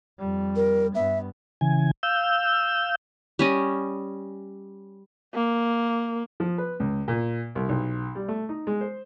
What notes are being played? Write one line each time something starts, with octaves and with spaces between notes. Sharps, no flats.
F2 G3
A#4
G2 B3 E5
C#3 E3 G#5
F5 E6 G6
G3 C#4 D#5
A#3
F3
B4
C#2
A#2
C2
B1
G3
A3
D#4
G#3
C5